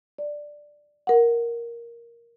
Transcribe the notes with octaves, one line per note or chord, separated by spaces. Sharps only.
D5
A#4 F#5